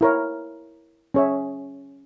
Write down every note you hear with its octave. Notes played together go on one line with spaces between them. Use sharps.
E4 A#4 C#5
C#4 G#4 C#5 E5